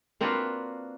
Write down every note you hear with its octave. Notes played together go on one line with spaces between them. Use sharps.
A#3 C4 D4 F4 F#4 B4